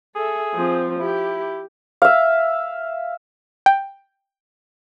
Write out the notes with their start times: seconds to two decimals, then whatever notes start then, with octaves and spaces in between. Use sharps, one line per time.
0.15 G#4 A4 E5
0.54 F3 C4
1.00 E4 G4
2.02 E5 F5
3.66 G5